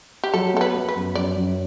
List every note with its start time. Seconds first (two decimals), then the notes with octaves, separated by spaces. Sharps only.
0.24 G4
0.34 F#3 A4
0.54 B3 A4
0.61 B4
0.75 B3
0.89 B4
0.95 F#2
1.15 F#2 D5
1.36 F#2